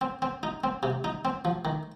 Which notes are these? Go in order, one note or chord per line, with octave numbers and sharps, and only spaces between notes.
C4
C4
D#4
C4
C3
D#4
C4
F3
D#3